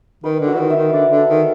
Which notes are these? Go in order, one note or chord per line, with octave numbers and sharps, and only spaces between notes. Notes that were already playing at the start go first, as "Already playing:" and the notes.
D#3 B4
D3
F#4
E3
D#3
E5
D#3
D3 D5
D3
A4
D#3